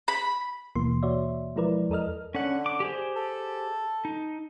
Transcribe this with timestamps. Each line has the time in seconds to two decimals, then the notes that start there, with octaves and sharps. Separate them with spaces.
0.08 B5
0.75 D#2 B2 E3 A#3 C6
1.03 F#4 C#5 D5 E5
1.56 F3 G#3 E4 A#4 B4 D5
1.90 E2 A4 A#4 D#5 F6
2.35 D3 C#4 F#5
2.66 D6
2.80 G4 G#4 C5
3.16 A4
4.05 D#4